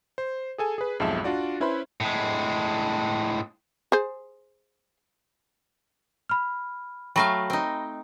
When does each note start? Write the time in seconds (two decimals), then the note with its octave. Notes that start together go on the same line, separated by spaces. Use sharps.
0.18 C5
0.58 G#4 A4 G#5
0.78 G#4 B4
1.00 B1 F2 G#2 G#3 E5 A5
1.24 D4 F4 F#4 D5
1.60 C#4 E4 B4 C5 B5 C6
2.00 A2 G#3
3.92 G#4 C5
6.29 B5 F6
7.16 F#3 A3 F5 G5 B5 A#6
7.50 C4 D#4